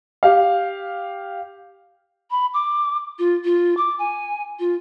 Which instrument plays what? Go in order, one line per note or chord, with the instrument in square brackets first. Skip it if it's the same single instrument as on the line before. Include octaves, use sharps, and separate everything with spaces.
[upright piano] G4 F5
[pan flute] B5
D6
F4
F4
D6
G#5
F4